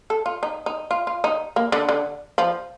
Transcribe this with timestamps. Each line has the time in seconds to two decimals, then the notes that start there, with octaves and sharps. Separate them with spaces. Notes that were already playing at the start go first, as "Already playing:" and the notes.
0.10 A4
0.26 F4
0.43 D#4
0.66 D#4
0.91 F4
1.07 F4
1.24 D#4
1.56 A#3
1.72 D3
1.89 D3
2.38 F3